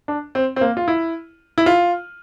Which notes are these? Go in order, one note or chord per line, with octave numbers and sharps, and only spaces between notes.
D4
C4
C4
A#3
F4
E4
E4
F4